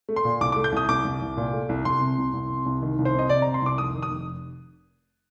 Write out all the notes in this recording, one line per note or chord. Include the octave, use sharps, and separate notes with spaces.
A3
C6
A#2
C2 D6
A3 D6
G6
C2 D#6
C2 D6
C2
C2
A#2
A3
C2
C2 C6
C3
C2
C2
C3
C2
D#3
C2
C5
C3 D#5
C3 D5
C3 A#5
C6
C2 D6
F1 D#6
D#3
D#6
F1